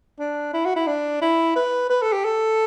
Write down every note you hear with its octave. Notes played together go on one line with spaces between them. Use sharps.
D4
E4
F#4
E4
D4
E4
B4
B4
A4
G4
A4